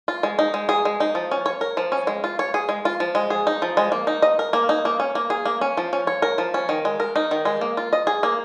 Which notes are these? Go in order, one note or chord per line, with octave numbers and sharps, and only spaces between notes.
F4
G#3
D#4
G#3
G#4
G#3
D#4
F3
C#4
C#5
A#4
F3
C#4
G#3
F4
C#5
G#4
G#3
F4
F3
G#3
G#4
D#4
F3
G#3
A#3
D#4
D#5
A#4
A#3
D#4
A#3
C#4
A#3
G#4
A#3
C#4
F3
C#4
C#5
A#4
F3
C#4
D#3
G#3
A#4
D#4
D#3
G#3
A#3
F4
D#5
G#4
A#3